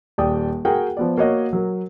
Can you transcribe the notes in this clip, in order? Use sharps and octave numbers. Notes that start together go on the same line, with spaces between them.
D#1 D5 G5 D#6
F#4 G#4 A#4 F#5 G5
F3 B3 D5
A#3 F#4 C#5 D#5 F#5
F#3 A#4